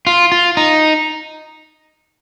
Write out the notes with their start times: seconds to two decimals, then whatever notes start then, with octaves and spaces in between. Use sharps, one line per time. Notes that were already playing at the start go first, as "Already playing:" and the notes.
0.07 F4
0.32 F4
0.57 D#4